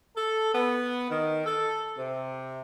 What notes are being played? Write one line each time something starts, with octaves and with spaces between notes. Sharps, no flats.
A4
B3
D#3
A4
C3